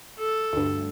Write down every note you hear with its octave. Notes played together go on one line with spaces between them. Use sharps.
A4
D2 G2